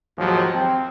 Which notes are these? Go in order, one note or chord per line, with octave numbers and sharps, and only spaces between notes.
D#2 G#2 F3 F#3
C4